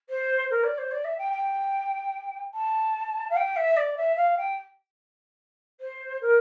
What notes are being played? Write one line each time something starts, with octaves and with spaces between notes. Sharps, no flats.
C5
A#4
D5
C5
D5
E5
G5
G5
A5
F5
G5
E5
D5
E5
F5
G5
C5
A#4